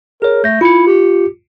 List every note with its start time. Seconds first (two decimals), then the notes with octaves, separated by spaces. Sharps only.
0.22 G#4 A#4 C#5
0.44 A3 G6 A#6
0.61 E4 F4 C#7
0.87 G4